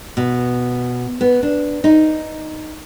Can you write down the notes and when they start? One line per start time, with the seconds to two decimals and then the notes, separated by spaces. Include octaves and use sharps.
0.17 B2
1.21 B3
1.43 D4
1.84 D#4